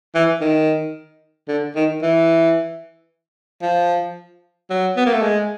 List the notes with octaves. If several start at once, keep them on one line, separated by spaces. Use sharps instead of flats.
E3
D#3
D3
D#3
E3
F3
F#3
B3
A#3
A3
G#3